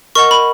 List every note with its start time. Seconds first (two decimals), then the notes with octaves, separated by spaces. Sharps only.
0.15 A#4 D#5 F#5 C#6
0.31 B5